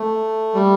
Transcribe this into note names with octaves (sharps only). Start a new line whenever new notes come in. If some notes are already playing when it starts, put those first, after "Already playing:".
Already playing: A3
G3